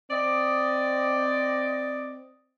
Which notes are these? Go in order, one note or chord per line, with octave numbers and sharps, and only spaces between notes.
C4 D5 D#5